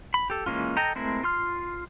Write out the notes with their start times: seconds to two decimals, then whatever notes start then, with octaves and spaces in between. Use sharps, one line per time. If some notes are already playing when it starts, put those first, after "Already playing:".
0.14 B5
0.30 G4 A4
0.46 E3 G#3 A#3 C#4 F4
0.77 A4 D#5 G5 A#5
0.95 G#3 A3 C4 E4 A#4
1.23 F4 C6 F6